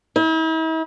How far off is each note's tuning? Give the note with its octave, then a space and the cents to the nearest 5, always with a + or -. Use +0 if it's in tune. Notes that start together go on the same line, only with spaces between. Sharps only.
E4 -45